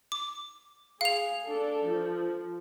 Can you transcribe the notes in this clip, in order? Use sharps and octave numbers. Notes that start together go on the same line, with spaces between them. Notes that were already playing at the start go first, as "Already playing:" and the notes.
D6
G#4 F5 F7
D4 A4
F3